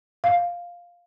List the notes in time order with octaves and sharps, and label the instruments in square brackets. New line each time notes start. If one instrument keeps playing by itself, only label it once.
[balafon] F5